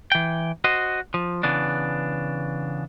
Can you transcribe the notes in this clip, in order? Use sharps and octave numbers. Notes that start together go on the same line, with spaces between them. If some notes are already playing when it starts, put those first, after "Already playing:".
E3 G5
F#4 C5 D#5
F3
C#3 E3 B3 D4